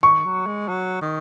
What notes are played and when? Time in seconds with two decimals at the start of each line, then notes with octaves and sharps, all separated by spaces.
0.03 D#3 C#6
0.25 F#3
0.47 G#3
0.68 F#3
1.02 D#3